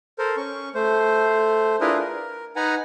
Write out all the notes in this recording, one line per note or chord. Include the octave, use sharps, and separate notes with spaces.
A4 A#4 C5
C#4 C#6
A3 C5
D4 E4 F4 G#4 A#4 B4
A#4
D#4 B4 F#5 G#5 A#5